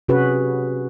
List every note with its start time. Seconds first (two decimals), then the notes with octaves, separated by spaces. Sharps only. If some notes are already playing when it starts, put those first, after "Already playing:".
0.09 C3 C#4 F#4 G#4 B4